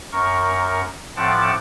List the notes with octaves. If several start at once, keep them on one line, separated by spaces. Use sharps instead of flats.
F#2 A#4 C#6
A2 F3 C4 F#5 A5 D6